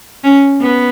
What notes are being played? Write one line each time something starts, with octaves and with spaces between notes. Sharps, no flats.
C#4
B3